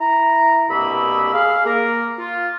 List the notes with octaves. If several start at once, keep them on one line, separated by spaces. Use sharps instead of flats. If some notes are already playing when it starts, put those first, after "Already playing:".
E4 A#5
C2 G2 B2 A#3 B5 E6
G#4 F5
A#3 A#4
F4